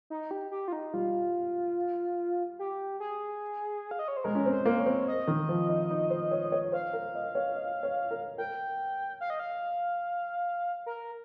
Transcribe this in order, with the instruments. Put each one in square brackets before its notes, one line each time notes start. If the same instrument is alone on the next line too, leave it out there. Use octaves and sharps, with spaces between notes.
[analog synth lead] D#4
G4
G4
F4
D#4
[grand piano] G3 [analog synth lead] F4
[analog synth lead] G4
G#4
F5
D#5
C#5
C5
[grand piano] G#3 [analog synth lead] A#4
[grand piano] C#4
C4
[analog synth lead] C5
[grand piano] A#3
[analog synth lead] C#5
[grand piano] C4
[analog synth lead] D#5
[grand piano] D#3
F3
D#4
D#4
C5
C#5
C#5
[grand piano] C5 [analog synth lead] F5
[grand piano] A#4
D#5
C#5
D#5
C#5
A#4
[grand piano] A#4 [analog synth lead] G5
[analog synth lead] F5
D#5
F5
A#4